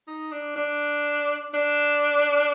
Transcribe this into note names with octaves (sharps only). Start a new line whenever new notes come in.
D#4
D4
D4
D4